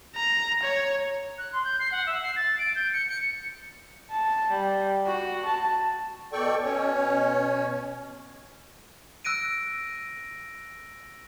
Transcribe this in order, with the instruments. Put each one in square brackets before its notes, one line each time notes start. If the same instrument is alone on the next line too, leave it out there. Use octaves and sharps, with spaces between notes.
[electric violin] A#5
C#5
[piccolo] F#6
C6
G6
C7
F#5
E5
C7
A6
D7
G6
C#7
C#7
[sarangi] A5
G3
F#4
A5
[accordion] B2 A4 D5 G5 C#6
B2 C#4 C#5
[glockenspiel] E6 F#6 A#6 D7 D#7